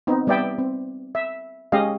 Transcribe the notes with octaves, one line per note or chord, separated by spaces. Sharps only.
B3 C4 D#4
G3 B3 D5 E5 G5
C4
E5
G#3 C#4 G4 D#5 F5